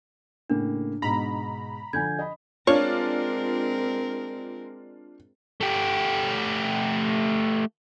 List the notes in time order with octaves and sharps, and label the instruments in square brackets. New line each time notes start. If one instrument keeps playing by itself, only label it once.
[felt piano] A2 C#3 A#3 [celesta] D4
[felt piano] G#2 B2 [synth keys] A#5 B5
[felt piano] D3 F3 [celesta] G#5 G6 G#6
[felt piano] D#5 B5
[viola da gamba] G#3 C4 A#4 [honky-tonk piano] D4 F4 [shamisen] C#5
[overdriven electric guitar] A3 G4